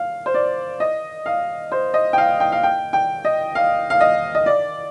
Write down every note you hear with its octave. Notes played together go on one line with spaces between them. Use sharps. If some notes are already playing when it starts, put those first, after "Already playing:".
Already playing: F5
C5
D5
D#5
F5
C5
D#5
G5
F5
G5
F5
G5
G5
D#5
F5
F5
D#5
D#5
D5